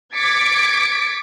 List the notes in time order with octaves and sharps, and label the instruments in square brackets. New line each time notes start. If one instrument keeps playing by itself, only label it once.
[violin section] D6 G#6 A6 B6 C#7 D7